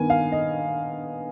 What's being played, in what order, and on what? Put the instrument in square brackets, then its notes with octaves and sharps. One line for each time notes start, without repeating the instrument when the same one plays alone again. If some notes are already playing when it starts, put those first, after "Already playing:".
Already playing: [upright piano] G2 D#3 B3 G#5
F5
D#5